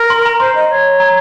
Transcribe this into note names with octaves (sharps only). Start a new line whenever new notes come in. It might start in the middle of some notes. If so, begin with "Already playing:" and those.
Already playing: A#4
C6
A#5
C5 C6
D#5
C#5
A#5